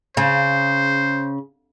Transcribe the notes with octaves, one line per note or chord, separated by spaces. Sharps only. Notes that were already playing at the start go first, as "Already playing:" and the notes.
C#3 C5